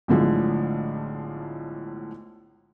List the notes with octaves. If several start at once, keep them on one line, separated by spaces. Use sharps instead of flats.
B1 A2 D3 F3 G#3